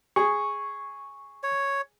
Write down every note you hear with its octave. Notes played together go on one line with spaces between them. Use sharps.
G#4 C#6
C#5